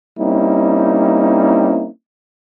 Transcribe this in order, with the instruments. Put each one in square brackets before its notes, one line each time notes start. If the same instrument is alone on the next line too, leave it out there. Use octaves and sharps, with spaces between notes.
[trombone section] G3 A#3 C4 C#4 D#4 E4